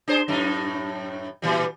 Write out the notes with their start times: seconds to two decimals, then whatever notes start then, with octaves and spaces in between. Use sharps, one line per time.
0.08 D4 G#4 C5
0.28 F#2 A2 D#4
1.42 A#2 E3 G3